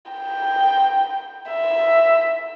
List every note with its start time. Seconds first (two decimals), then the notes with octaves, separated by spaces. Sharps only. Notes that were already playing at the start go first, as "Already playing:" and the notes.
0.11 G5
1.51 E5